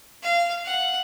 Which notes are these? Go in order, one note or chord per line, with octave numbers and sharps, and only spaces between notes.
F5
F#5